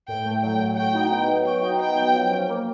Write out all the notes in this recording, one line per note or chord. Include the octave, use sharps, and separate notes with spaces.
A2 G5
A3
F#3 G5
A2
F#4 G5
D#4
B3
F#3
F#4 G5
D#4
B3 G5
F#3
F3
C#4
A#3